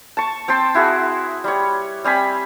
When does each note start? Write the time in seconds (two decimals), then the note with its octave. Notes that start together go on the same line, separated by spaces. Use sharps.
0.17 A5 C#6
0.48 C4 G5 A5 C6
0.75 E4 F#4 G#4
1.44 G3 C#5
2.04 G3 C4 G#5 B5